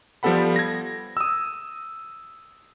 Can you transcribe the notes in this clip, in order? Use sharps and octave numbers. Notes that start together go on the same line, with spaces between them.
F3 G3 B3 A4 F#5 B5
G#6 A#6
D#6 E6